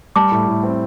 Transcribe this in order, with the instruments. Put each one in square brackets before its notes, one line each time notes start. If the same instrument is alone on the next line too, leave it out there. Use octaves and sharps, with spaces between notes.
[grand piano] G3 [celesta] A5 D6
[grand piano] A2
A2
C4